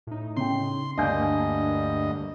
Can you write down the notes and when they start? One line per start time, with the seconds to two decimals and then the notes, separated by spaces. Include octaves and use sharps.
0.07 A2 D#4
0.37 C#3 G5 C6
0.98 D2 G2 A#3 D4 D#5 F5 G#5 G6